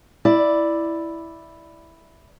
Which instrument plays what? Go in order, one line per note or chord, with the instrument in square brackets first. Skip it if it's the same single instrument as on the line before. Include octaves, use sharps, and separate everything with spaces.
[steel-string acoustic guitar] E4 D5